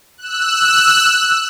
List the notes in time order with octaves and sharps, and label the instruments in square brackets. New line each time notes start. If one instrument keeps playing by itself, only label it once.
[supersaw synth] E6 F#6